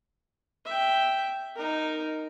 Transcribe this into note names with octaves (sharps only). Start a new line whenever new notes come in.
E5 G5
D#4 A#4